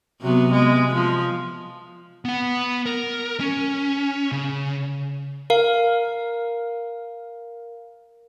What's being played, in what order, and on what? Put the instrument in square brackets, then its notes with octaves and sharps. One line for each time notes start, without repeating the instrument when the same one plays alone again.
[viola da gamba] C3 F#3 B3
G#3 B3
F3
[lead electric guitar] B3 F#5
A#4
C#4
C#3
[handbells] A#4 F5